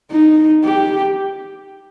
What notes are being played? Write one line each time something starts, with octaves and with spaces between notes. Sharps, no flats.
D#4
G4